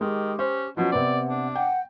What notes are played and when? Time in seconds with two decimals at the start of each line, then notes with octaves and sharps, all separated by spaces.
0.01 D#3 G#3 G4
0.39 C#4 C5
0.77 B2 F3 F#3 C#4 F#5
0.92 C3 B3 C4 D5
1.29 D4
1.55 F#5 G5